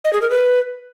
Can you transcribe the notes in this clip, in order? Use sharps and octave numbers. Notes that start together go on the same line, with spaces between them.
D#5
G#4
A#4
B4